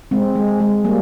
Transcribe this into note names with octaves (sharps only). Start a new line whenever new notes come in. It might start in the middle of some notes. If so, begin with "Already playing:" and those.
G#3 C4
G#3
G#3
G3 A#3